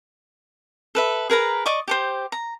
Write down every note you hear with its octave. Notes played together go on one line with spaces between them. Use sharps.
A4 B4 E5
G#4 A#4 B4 A#5
D5 D#5 C#6 D6
G4 A4 C5
A#5